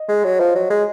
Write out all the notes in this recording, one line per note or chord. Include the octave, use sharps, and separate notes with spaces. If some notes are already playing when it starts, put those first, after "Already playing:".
Already playing: D#5
G#3
F#3
F3
F#3
G#3